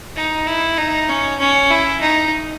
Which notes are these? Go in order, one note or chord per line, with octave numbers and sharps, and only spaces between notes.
D#4
E4
D#4
C#4
C#4
E4
D#4